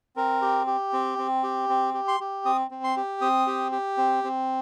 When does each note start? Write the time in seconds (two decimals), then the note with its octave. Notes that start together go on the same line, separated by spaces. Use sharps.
0.16 C4 A#4
0.41 G4
0.67 G4
0.93 C4
1.18 C4
1.43 G4
1.69 C4
1.94 G4
2.08 C6
2.20 G4
2.45 C4 D#6
2.71 C4
2.84 C6
2.97 G4
3.21 C4 D#6
3.47 G4
3.72 G4
3.98 C4
4.24 C4